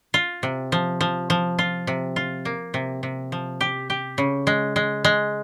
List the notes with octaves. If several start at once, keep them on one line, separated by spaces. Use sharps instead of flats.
F4
C3
F3
F3
F3
F4
C3
F4
A#3
C3
C3
F3
G4
G4
C#3
G#3
G#3
G#3